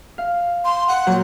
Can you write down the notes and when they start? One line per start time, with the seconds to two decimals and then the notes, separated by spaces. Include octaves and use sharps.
0.18 F5
0.65 C6
0.88 F#5
1.07 A#2 F#3 G6